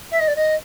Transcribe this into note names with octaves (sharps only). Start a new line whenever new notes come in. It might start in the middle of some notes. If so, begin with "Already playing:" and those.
E5
D#5
D5
D#5